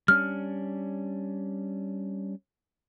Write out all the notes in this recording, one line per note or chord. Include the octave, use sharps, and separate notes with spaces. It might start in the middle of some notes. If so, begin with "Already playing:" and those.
G3 C#4 D4 F6